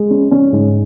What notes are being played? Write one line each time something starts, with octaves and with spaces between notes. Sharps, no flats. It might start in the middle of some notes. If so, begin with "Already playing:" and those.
Already playing: G#3
C#4
C#4
G#2